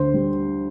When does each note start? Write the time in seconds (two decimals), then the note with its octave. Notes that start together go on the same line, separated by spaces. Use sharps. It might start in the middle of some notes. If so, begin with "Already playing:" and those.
Already playing: D2 C5
0.14 G3